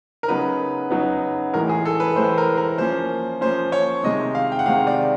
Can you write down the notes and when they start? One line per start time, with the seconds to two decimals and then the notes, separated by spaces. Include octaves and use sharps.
0.23 A#4
0.28 C#3 F#3 B3 D#4 B4
0.90 C#3 F#3 B3 D#4
1.53 A2 E3 G#3 A#4
1.69 G#4
1.85 A4
2.00 B4
2.16 A2 E3 G#3 C5
2.38 A#4
2.57 A#4
2.78 F3 A#3 C#4 C5
3.41 F3 A#3 C#4 C5
3.72 C#5
4.03 C3 D#3 G#3 D#5
4.35 F5
4.52 G5
4.59 F#5
4.66 C3 D#3 G#3 F5
4.87 D5